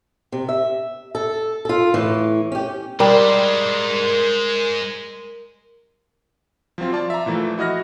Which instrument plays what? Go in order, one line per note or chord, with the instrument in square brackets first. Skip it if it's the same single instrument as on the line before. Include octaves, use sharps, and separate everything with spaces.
[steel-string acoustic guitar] C3
E5
A4
F4 A4
A2 E3
C#4 G4
[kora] G3 [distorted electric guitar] G#3 C5 [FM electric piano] A#4
[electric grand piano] F3 F#3 C4 F4
F4 D5 A5
E5 A#5
A#2 E3 F3 A3
E4 F#4 D#5 F6 A#6